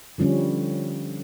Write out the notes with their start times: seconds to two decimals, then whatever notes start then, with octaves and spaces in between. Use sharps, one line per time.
0.18 D3 F3 G3 C#4